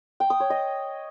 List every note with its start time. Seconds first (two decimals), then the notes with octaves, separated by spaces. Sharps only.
0.20 G5
0.30 D#6
0.40 C#5
0.50 D#5